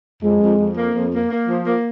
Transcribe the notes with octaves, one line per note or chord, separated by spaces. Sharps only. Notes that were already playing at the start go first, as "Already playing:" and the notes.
F2 G#3
F2
F2
A#3
F2
A#3
A#3
F3
A#3